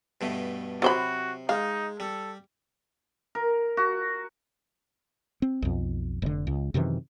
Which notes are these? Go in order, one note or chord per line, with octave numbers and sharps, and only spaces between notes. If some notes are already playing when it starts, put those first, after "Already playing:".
G2 B2 A3
C3 F#3 F#4 C5 B5
G#3 D#4 F5
G3 A4
A#4
F#4
C4
B1 F2
F1 D3
C#2
F#2 C3 D#3 E3